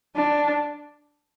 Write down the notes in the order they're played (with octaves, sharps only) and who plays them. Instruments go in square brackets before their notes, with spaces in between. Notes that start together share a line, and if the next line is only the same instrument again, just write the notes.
[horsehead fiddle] D4